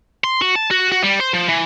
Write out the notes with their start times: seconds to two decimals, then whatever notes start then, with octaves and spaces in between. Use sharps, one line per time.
0.24 C6
0.42 F#4
0.56 A5
0.71 F#4
0.92 F#4
1.03 G3
1.20 C5
1.34 F3
1.48 E3